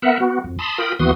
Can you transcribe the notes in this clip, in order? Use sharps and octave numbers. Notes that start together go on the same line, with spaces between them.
B3 A#4 E5 F#5
B3 F#4
F2
A5 B5 C6 D#6
F4 A#4 G5 B5 D#6
D#2 E3 B3 F#4 C6 D#6